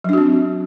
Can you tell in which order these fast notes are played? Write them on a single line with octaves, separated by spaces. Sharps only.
F#3 D4 F#4 C4